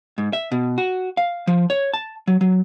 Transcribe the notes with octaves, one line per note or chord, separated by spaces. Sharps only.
G#2
E5
B2
F#4
F5
F3
C#5
A5
F#3
F#3